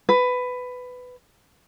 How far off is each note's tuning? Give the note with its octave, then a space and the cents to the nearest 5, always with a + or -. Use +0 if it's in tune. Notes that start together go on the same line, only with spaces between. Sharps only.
B4 +15